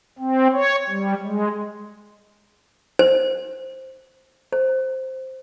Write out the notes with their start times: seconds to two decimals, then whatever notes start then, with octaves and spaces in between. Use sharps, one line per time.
0.19 C4
0.53 C#5
0.90 G3
1.24 G#3
2.99 C5
4.53 C5